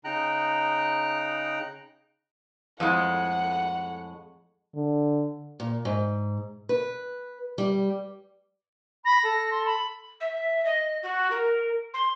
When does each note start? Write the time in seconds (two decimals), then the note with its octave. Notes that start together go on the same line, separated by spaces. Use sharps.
0.04 C#3 D#4 G5 A#5 F#6
2.80 F2 A2 G#3 F#5
4.75 D3
5.60 A#2
5.85 G#2
6.69 B4
7.58 G3
9.05 B5 A#6
9.24 A4
9.51 C6
9.66 B5
10.20 E5
10.64 D#5
11.02 F#4
11.31 A#4
11.93 C6